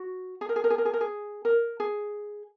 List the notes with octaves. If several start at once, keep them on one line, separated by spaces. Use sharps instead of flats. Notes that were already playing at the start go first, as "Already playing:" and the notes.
Already playing: F#4
G#4
A#4
G#4
A#4
G#4
A#4
G#4
A#4
G#4
A#4
G#4